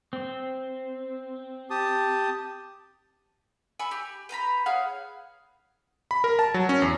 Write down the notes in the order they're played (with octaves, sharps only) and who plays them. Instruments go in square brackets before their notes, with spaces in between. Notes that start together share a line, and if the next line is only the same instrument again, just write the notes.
[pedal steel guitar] C4
[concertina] G4 A5 D#6
[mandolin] G#5 B5 C#6 E6
G4
B4 C5 A#5 B5
G#4 C#5 F5 F#5
[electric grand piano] B5
A#4
A5
F#3
C#4
E2